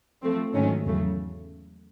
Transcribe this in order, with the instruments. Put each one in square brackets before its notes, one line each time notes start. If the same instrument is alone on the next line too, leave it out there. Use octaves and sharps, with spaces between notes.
[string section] F3 A3 C4
G#2 D#3 F#3 A3 C#4
E2 C#3 F#3 A3